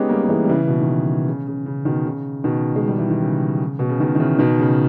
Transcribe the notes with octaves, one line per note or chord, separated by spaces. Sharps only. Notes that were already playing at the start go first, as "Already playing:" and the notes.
Already playing: G#3 B3 C#4 D#4 G4
G3 A#3
A#3
E3 G#3
G3
C#3 E3
C#3
B2
D#3
C#3
C#3
C#3
C#3
B2 D#3
C#3
B2 D#3
G#3
G3
E3
D#3
C#3
B2
C#3
B2 D#3
D#3
C#3 E3
B2 D#3
C#3